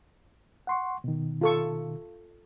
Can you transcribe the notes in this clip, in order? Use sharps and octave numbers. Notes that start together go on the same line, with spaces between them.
F#5 C6 C#6
B2 D#3
F4 A4 C#6